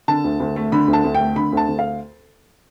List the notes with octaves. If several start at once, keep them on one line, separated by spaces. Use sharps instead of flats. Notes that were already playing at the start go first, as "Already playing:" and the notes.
D3 A5
D2
D2
A3
D3 B5
D2
A5
D2
G5
A3
D3 B5
D2 A5
D2
F5